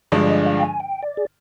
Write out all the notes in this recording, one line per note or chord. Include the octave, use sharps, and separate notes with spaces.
G2 D3 F3 G#3 D4 D5
D#5
F5
G5
G#5
G5
D5
G#4